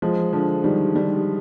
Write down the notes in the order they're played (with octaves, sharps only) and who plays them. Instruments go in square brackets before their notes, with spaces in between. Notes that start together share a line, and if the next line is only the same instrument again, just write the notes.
[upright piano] F3 G#3
D3 F3
D#3 G3
D#3 G3